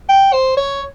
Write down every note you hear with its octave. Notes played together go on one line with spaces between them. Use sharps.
G5
C5
C#5